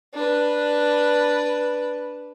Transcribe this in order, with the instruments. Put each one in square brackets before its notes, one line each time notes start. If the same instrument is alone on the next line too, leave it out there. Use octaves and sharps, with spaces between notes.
[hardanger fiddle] D4 B4